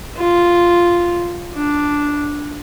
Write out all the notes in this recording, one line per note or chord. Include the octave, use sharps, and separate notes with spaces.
F4
D4